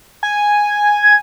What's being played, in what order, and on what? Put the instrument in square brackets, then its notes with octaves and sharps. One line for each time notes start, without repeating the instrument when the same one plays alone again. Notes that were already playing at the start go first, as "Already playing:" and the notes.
[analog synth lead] G#5
[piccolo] G#6